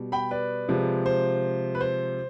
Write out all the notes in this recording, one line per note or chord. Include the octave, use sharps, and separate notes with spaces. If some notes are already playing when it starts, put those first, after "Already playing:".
Already playing: B2 G3
G5 B5
B4 D5
C3 F3 G#3
C5
B4
C5